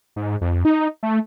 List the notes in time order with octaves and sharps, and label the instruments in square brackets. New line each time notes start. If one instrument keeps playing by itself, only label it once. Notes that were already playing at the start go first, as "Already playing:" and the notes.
[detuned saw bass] G#2
F2
D#4
A3